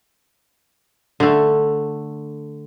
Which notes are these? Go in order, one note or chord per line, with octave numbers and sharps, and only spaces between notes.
D3 A3